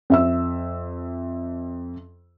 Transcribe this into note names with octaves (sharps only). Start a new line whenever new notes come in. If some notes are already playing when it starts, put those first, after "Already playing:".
F2 E5 E6